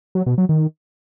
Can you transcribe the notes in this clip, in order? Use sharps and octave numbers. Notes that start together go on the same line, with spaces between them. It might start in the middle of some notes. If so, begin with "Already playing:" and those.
F#3
B2
F#3
D#3